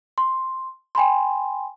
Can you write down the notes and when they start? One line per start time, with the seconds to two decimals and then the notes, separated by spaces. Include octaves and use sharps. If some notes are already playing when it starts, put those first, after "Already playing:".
0.18 C6
0.95 G5 G#5 B5 C6